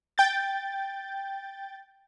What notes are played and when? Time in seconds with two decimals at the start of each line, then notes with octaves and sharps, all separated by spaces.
0.18 G5 G6 A6